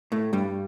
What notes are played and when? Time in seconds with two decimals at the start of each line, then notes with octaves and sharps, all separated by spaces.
0.12 A2 A3
0.33 G2 G3